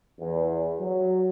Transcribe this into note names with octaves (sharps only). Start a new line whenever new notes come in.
E2
F#3